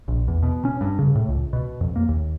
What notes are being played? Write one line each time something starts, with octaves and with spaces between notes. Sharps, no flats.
A#1
E2
B2
C#4
G2
C#3
A2
C#2
B2
F2
A#3
D#2